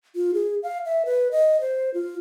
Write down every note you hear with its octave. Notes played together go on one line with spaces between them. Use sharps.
F4
G#4
F5
E5
B4
D#5
C5
F4